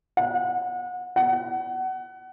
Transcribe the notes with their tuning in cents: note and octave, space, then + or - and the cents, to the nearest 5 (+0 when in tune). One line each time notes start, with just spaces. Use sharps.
F#5 -30
F#5 +25